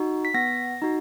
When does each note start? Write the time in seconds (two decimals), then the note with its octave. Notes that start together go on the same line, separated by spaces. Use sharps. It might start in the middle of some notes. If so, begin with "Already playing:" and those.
Already playing: D#4 F#4
0.25 B6
0.34 B3 A#6
0.82 D#4 F#4